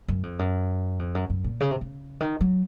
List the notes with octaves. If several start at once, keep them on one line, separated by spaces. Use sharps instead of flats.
F#2
F2
F#2
F2
F#2
F#2
A#2
C#3
C3
C#3
D#3
F#3